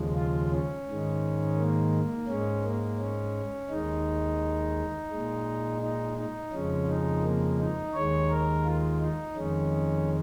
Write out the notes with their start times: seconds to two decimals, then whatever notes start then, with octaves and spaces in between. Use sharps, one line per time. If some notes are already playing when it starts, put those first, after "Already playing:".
Already playing: D#2 C#3 F3 G#3
0.15 F4
0.51 C#4
0.87 G#2 D#3 G#3
1.58 A#3
2.28 G#2 G#3 C#4
2.63 A#3
2.99 C#4
3.69 D#2 D#3 G#3 D#4
5.11 A#2 G#3
5.82 D#4
6.17 D#4
6.52 F2 C#3 F3 G#3 C#4
6.88 D#4
7.23 A#3
7.58 D#4
7.94 D#2 D#3 G#3 C#5
8.29 A#4
8.65 F4
9.00 D#4
9.36 F2 D#3 G#3 C#4